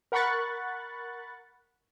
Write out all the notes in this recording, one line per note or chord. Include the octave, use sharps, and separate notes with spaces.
A#4 F#5 B5 C#6 F#6 A6